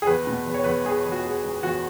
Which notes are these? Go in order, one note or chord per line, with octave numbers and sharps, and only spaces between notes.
G#4
E2 B4
B2
E2 B4
C#5
E2 B4
E1 G#4
E2
F#4
G#3
E1
E2 F#4